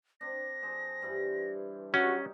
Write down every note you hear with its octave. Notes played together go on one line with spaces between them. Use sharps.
C4 D4 A#6
F3 G#4 C5
G2 E3 E4
F#3 G3 C#4 D#4 F#4